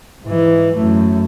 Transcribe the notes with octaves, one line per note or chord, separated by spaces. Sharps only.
G#2 E3
F#2 A3